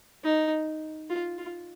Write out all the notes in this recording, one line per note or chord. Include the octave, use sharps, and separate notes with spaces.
D#4
F4
F4